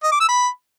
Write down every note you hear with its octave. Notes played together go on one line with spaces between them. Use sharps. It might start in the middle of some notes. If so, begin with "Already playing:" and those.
D#5
D6
E6
B5